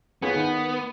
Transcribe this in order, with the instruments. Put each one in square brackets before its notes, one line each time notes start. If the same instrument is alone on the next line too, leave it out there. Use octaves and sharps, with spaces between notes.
[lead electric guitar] B3 [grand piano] F4 G#4 C#5
[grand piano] D#3 D#4